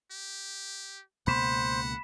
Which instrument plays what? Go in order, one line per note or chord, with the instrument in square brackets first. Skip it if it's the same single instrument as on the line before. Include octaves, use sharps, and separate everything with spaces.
[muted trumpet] G4
[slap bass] C#2 B2 A#3 [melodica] C5 [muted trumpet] F#5 [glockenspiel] B5 B6 E7